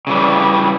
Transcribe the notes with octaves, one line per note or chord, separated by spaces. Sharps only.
C#3 E3 G3